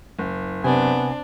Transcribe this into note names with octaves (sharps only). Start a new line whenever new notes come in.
F#1
C3 B3 C4 D4 G#5